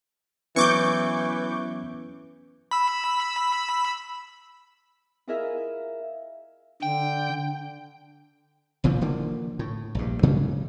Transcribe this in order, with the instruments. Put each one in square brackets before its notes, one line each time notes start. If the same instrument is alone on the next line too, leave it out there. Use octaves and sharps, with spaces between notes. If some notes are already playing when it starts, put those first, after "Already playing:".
[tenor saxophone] E3 [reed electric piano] F#3 B3 C#4 [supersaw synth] C#6 D6 G6
[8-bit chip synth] B5 E6
[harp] E4 F4 G#4 A#4 D#5 E5
[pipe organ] D3 [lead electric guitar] G5
[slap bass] F#1 A#2 E3 F3
D3 F3 A#3
A2
A#1 G2
G#2 C#3 F#3 G3